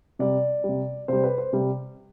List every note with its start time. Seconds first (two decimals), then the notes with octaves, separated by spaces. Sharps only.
0.19 C3 G3 D5
0.64 C3 G3
1.08 C3 G3 C5
1.24 B4
1.38 C5
1.53 C3 G3